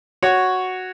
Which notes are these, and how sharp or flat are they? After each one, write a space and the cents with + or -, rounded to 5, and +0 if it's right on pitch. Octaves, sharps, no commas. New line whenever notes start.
F#4 +0 C#5 +0